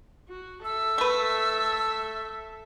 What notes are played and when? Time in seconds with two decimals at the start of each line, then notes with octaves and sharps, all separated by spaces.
0.29 F#4
0.64 A4 E5 E6
0.98 A3 B4